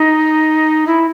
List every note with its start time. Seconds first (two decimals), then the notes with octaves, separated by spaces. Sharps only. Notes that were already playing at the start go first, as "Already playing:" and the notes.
Already playing: D#4
0.87 E4